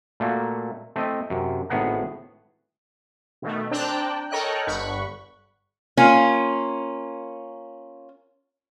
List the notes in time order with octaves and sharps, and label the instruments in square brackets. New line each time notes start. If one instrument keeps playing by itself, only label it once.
[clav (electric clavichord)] A#2 A3 A#3 F#4
A3 C4 E4 D#5
F#2 C3
G#1 A2 B3 G#4 F#5 A#5
[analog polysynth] B2 D#3 A3
C4 D4 G5 A5 A#5 F#6
A4 A#4 C#5 D#5 G5 F#6
G1 G2 F#5 B5 C#6
[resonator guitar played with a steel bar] A#3 C#4 F4